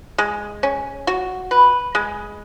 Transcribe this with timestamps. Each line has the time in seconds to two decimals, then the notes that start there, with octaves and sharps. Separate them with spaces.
0.18 G#3
0.63 C#4
1.07 F#4
1.51 B4
1.95 G#3